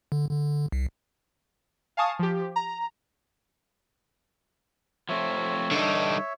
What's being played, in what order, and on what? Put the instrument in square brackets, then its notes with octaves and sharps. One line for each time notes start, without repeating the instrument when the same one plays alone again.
[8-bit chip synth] D3
D3
C2
[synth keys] F5 G#5 A5 C#6 D#6
F3 G4
A#5
[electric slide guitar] F3 A3 C4 [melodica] C#5 E5
[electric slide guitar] G2 D4 [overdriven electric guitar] D3 D#4